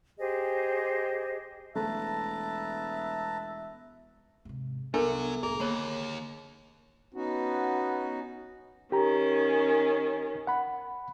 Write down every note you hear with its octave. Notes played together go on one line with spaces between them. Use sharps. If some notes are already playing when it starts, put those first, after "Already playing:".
G4 G#4 C5 D#5
E1 A3 B4 E5 A5 A#5
G#2 C3
C2 F#3 B3 D4 A4 A#4
C2 A2 A#3 G#4 A#4
D#2 D3 A#3 C#5
B3 C#4 D#4 F#4
D#3 C#4 G4 A#5
F#5 B5